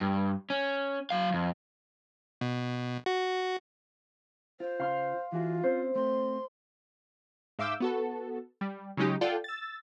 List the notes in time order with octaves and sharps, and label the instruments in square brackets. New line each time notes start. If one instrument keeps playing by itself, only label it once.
[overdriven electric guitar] G2
C#4
F#3 F5
F2
[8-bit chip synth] B2
F#4
[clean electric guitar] F4 [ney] C5
[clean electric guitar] C#3 F4 [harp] F5 C6 F6
[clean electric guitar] E3 F#4 G#4 [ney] F4
[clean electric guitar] C4 C#4 [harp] C5
[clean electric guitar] A3 C4 [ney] C6
[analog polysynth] G#2 E5 F5 D6 E6 G6
B3 F#4 A4
G3
C#3 F#3 G#3 C#4 D#4 G4
F4 A4 D5 F#5 G5
E6 A6